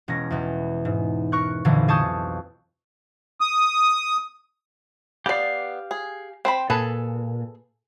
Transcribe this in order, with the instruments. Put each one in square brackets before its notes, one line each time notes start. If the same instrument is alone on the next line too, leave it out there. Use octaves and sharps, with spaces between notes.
[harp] E1 C#4 A#6
E2 B2
G#2
A#4 C#6 F#6
B1 F2 A#2 D3 E3
G#4 A5 C#6 D#6 G6
[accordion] D#6
[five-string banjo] B3 D5 [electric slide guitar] G4 F5
[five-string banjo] G#4
C4 C5 B5
[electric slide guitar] A#2 [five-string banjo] G#4 A4 B4